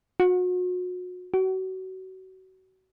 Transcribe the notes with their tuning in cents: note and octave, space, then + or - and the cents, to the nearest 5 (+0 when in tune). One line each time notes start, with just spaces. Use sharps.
F#4 -35
F#4 +30